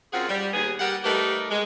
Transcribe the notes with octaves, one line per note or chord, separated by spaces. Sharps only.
F#2 C4 F4 G#4 F#5
G3
D#2 B3 G#4
G3 G4 A#4 F#5
G3 A3 D#4 G4 A#4 B4
G#3